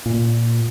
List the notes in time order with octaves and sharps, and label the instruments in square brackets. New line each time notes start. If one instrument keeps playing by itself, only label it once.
[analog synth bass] A#2